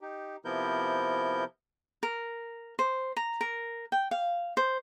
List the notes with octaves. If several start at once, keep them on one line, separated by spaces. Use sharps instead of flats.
D#4 G4
C3 F3 B3 E4 A#4 G6
A#4
C5
A#5
A#4
G5
F5
C5